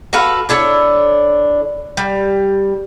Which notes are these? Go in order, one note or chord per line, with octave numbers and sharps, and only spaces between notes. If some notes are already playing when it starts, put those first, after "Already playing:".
F#4 A4 B4 F5
D4 E4 A4 C#5
G3